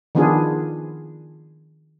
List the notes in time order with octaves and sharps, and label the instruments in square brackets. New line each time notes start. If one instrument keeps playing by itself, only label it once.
[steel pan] D#3 F3 B3 D4 F4 G#4